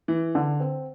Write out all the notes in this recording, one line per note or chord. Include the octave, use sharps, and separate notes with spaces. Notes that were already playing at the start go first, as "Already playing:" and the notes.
E3
D3
C4